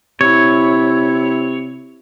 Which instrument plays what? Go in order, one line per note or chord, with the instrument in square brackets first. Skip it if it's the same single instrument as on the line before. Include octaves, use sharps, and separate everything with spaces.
[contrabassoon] C3 [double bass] E4 [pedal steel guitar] C#5